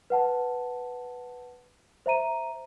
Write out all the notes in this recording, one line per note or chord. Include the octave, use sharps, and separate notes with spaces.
B4 F#5 A5
C5 E5 A#5 D#7